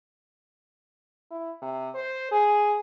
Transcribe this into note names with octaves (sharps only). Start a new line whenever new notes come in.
E4
C3
C5
G#4